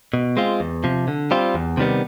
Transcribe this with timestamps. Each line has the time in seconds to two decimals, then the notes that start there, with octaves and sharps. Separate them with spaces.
0.13 B2
0.37 G#3 C4 F4
0.60 E2
0.84 C3 F3
1.08 D3
1.31 G3 C4 F4
1.54 E2
1.77 C3 D#3 G3 B3